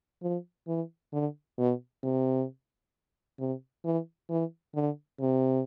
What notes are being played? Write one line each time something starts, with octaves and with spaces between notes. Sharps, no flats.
F3
E3
D3
B2
C3
C3
E3
E3
D3
C3